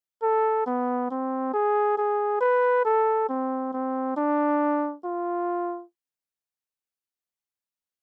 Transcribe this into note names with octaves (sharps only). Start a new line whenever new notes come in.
A4
B3
C4
G#4
G#4
B4
A4
C4
C4
D4
F4